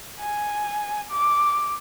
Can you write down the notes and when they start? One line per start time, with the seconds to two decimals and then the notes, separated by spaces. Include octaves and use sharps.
0.20 G#5
1.11 D6